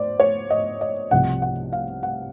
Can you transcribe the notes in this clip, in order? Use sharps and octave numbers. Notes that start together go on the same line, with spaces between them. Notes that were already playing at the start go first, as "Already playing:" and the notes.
Already playing: C5 D5
C#5
D#5
D#5
C2 C3 F3 F#5
F#5
F5
F#5